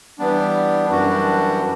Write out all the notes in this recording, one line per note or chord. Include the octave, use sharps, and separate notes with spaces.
E3 G3 B3 D4
F#2 E3 G3 D4 F#4